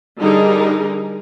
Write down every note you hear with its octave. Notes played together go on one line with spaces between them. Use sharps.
D3 G3 D#4 G#4 A#4